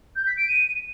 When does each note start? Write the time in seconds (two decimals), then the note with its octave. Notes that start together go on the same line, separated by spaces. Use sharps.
0.15 G6
0.26 B6
0.37 D7
0.48 D#7